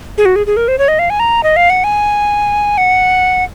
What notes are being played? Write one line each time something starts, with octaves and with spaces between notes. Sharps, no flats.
G#4
F#4
G#4
G#4
A#4
C5
C#5
D#5
F5
G#5
A#5
D#5
F5
F#5
G#5
F#5